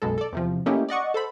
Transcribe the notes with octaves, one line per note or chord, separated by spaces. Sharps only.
B1 F#2 B2 G#3 A4
A4 D5
E2 C3 F3
A3 A#3 C#4 D#4 E4 G4
D5 D#5 F#5 C#6
A4 C5 B5